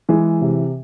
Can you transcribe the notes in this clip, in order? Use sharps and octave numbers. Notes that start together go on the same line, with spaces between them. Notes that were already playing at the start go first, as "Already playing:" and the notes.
E3 G#3 G#4
C3